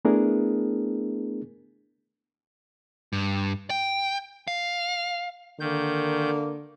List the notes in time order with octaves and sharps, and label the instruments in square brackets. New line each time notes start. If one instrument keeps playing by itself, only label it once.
[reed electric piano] A3 B3 D4 E4 G#4 A#4
[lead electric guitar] G2
G5
F5
[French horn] D3 [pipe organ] D#3 G6 [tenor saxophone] A#3